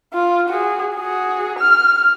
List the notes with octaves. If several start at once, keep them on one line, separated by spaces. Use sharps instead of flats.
F4
F#4 G#4
F#4 G#4
F6